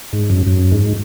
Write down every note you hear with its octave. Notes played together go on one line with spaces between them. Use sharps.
G#2
F#2
F#2
G#2